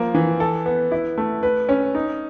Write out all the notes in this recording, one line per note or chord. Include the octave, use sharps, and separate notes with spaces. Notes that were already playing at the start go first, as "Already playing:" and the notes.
Already playing: F3 A#3
E3
A4
B3
E4
A3
B4
C#4
D#4